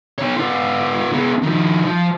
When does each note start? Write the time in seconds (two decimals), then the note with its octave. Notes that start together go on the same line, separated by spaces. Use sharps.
0.18 B3 C#5
0.37 B3 F4
1.12 G#3 B3
1.42 D#3 F3
1.85 F3